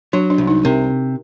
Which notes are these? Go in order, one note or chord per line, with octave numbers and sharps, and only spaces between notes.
F#3 D4
D4
C2
D#4
C3 A#4